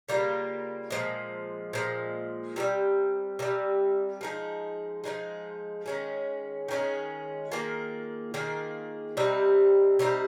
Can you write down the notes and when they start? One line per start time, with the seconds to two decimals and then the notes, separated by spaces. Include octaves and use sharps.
0.09 C#3 G3 A#3 F4
0.90 A#2 F3 G#3
1.73 A#2 F3 G#3
2.56 C3 D#3 G3
3.39 C3 D#3 G3
4.21 F3 G#3 D#4 G#4
5.04 F3 G#3 D#4 G#4
5.86 D#3 G#3 C#4 G#4
6.68 D#3 G#3 C#4 G#4
7.52 D#3 A#3 F4 G#4
8.34 D#3 A#3 F4 G#4
9.17 C3 G3 C4 D#4
9.99 C3 G3 C4 D#4